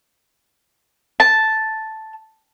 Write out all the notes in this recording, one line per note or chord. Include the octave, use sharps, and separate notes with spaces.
A5